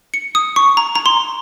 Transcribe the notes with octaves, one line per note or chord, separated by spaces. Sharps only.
C#7
D#6
C#6
A#5
A#5
C6